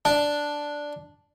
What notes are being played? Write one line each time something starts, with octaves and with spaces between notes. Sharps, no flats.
D4